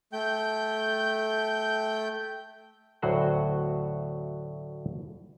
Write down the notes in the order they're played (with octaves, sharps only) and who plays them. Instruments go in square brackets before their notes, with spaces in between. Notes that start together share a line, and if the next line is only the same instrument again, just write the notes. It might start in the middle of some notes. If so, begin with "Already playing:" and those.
[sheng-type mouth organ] A3 G5 G6
[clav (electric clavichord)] D2 A2 F#3 F#4 C5 F#5